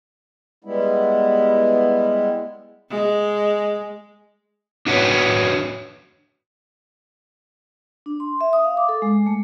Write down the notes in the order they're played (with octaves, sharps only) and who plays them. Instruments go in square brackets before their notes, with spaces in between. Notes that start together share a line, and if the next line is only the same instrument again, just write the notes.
[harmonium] G3 G#3 B3 E4
[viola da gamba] G#3
[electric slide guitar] D4 F#4 B4 C#5
[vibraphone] D4
C6
E5
D#6
F5
D6
A4
G#3
A3